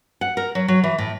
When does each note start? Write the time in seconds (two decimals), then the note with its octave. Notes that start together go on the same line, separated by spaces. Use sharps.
0.21 F#5
0.37 A#4
0.55 F#3
0.68 F#3
0.84 E3
0.98 A2